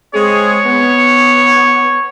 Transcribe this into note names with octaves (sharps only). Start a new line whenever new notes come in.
G#3 C4 G#4 C#5
B3